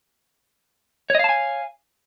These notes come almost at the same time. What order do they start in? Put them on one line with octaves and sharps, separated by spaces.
C#5 D#5 F5 A5 G#5